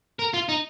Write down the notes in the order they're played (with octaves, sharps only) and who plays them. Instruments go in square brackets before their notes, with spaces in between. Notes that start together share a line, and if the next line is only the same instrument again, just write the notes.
[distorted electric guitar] A#4
F4
D#4